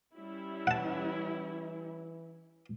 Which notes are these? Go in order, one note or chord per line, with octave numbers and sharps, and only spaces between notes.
G3 C#4 E4
E3 F#5 A5